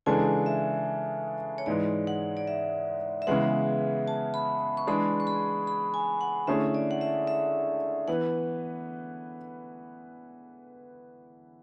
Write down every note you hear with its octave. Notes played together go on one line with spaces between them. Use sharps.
C#3 E3 G#3 D4 A4 G#5
E5
C#5
G#2 E3 G#3 D5
F#5
D5
E5
E5
C#3 E3 G#3 B3 F#5
A5
B5
C#6
E3 G#3 D4 G#4 B5
C#6
B5
B5
G#5
F#5
D3 A3 C#4 E4 G#4 E5
D5
F#5
E5
E5
E3 B3 F#5